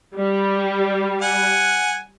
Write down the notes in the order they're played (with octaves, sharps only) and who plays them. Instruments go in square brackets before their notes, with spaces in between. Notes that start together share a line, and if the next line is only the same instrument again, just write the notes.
[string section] G3
[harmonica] F#5 G#5